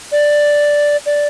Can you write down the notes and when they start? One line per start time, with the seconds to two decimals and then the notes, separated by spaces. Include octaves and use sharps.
0.12 D5
1.06 D5